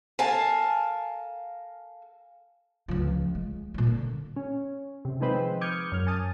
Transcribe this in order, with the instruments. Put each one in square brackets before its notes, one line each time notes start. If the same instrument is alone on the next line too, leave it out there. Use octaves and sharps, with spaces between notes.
[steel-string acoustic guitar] A4 A#4 F5 G#5 A5
[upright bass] C#2 F3
G#3
A#2 G3
D3
[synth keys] C#4
C3
D#3 F3 G#3 C4 B4 C5
D6 D#6 F6 G6 G#6 C#7
F#2 F6
G#5 A5 D#6